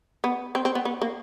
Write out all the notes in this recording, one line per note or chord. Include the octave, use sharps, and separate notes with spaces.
B3
C4
C4
B3
B3
A#3